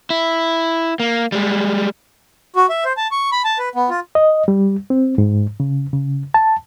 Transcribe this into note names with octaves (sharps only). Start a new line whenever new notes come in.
E4
A#3
G3 G#3
F#4
E5
C5
A5
C#6
B5
A5
B4
B3
F4
D#5
G3
C4
G#2
C#3
C#3
A5